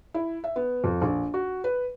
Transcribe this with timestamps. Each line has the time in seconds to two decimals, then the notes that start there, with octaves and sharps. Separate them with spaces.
0.14 E4
0.44 E5
0.56 B3
0.84 F2
1.02 A#1
1.34 F#4
1.64 B4